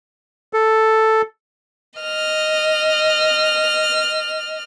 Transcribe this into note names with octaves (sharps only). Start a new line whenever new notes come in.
A4
D#5 F6